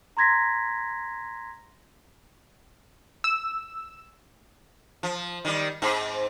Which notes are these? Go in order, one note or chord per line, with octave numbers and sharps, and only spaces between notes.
A#5 C6 G#6 A#6 B6
E6
F3
D#3 G3
G#2 C4